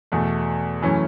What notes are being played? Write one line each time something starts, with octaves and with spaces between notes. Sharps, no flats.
E2 B2 A3
F#2 E3 A3 C#4